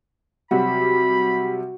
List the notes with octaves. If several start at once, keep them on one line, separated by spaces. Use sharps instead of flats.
C3 F#3 G3 F#4 B5